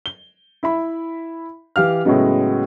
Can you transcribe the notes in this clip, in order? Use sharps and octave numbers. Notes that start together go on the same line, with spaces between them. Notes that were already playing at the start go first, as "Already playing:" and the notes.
G7
E4 E5 B5
E3 G4 F5 F6
A2 C#3 F#3 G#3 B3